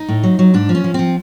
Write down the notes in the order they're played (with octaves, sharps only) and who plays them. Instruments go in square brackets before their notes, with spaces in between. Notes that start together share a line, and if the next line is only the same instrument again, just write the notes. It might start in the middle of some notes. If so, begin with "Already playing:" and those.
Already playing: [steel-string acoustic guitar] D#4
A2
F#3
F#3
G#2 D4
F3
C#4
F3
F3 C4